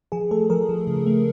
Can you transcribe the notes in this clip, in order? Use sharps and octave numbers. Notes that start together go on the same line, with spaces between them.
F3 G#4
A3 A4
F3 A#4
F3
C#3
A3